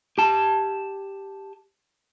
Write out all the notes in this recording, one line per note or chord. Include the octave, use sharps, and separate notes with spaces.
G4 A5